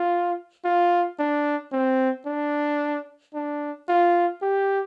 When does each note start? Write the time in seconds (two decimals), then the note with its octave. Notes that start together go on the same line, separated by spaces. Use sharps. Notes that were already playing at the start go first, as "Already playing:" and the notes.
Already playing: F4
0.64 F4
1.19 D4
1.72 C4
2.26 D4
3.34 D4
3.89 F4
4.42 G4